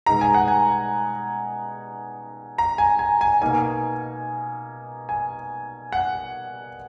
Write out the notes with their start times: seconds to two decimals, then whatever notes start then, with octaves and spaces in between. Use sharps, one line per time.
0.06 B2 G#3 D#4 A#5
0.21 G#5
0.34 F#5
0.48 G#5
2.58 A#5
2.78 G#5
2.99 G#5
3.21 G#5
3.41 B2 A#3 D#4 G#5
5.09 G#5
5.92 F#5